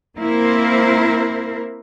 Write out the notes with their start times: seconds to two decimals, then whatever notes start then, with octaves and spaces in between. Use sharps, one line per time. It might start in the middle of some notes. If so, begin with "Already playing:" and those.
0.17 A#3 C4 E4 A#4 C5